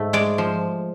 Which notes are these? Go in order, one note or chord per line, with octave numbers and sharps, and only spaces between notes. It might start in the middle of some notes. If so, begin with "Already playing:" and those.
Already playing: G#2 A3
G#3 D5
F3